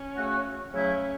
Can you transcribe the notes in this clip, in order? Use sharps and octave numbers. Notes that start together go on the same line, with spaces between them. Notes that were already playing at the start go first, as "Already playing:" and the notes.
Already playing: C#4
C#3 A3 F#4
C#3 F#3 A3 C#4 E4